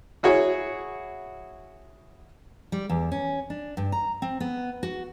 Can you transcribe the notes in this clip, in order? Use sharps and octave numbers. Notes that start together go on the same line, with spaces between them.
E4 F#4 G#4 C#5
G3
E2
C#4
D4
G2
A#5
C4
B3
F#4